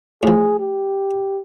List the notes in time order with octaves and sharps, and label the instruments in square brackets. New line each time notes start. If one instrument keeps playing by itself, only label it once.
[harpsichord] A2 F3 [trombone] G#4
[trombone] G4